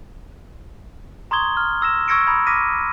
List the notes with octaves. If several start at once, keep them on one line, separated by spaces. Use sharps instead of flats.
A#5 C6 C#6 D#6 G#6 G7
F6
E6 A#6 E7
C#6 E6 G#6 A#6 C#7 D7
A#5 B5 C#6 D#6 G#6
D6 E6 F6 A#6 B6 D#7